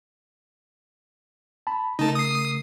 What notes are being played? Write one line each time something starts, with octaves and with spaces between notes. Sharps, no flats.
A5 B5
C#3 A3 D#4 A#4 A5
D#6 C7